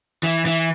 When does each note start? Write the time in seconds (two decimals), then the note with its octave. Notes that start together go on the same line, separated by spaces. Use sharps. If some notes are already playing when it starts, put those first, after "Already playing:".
0.23 E3
0.46 E3